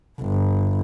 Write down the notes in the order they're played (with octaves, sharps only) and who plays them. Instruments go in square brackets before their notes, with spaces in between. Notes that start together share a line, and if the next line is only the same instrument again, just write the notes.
[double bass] G1